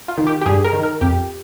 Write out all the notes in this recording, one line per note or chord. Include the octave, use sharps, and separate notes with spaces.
F4
D#3
G4
G4
G2 G#4
A#4
D#3
A#4
F2 G4